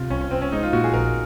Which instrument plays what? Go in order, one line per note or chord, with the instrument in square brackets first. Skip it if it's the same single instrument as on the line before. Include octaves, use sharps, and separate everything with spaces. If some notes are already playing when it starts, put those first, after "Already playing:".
Already playing: [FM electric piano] C3 [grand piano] F4
[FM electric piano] C2 [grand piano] C#4
[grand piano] C#4
[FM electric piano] C2 [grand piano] C4
[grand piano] C#4
[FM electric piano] G#3 [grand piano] D#4
[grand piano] F4
[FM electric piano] A#2 [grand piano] F#4
[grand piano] G#4
[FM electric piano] A#1 [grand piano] A#4